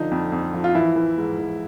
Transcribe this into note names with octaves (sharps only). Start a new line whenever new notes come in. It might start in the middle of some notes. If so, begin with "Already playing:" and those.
Already playing: D3 F3 D#4
F2
F2
F3
F4
E3 E4
E3
G#2
E3